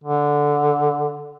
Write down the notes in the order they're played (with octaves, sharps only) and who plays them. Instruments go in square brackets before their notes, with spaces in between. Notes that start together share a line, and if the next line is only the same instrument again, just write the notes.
[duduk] D3